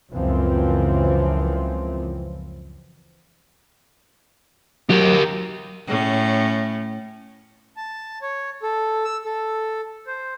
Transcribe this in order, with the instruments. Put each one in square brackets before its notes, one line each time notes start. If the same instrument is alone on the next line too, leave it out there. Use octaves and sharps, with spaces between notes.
[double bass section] C#2 F#2 E3 F3 C4
[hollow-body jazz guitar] F#3 [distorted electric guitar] G4 A#4
[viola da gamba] A2 C#4
[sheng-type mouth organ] A5
C#5
A4
E6
A4
C5